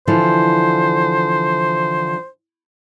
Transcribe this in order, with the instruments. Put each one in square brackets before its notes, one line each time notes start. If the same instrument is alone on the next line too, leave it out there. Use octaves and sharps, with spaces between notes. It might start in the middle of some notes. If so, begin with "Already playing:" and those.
[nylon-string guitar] D3 E3 F3 [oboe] C5